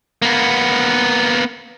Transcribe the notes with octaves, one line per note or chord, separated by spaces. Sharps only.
A#3 B3